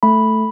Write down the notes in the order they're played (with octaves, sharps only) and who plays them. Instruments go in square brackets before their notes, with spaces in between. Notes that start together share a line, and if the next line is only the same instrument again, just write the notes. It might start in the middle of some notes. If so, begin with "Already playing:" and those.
[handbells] A3 B5